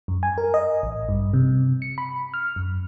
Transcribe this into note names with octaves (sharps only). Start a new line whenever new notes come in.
F#2
G#5
A#4
D#5
A1
G2
C3
C#7
B5
F6
F#2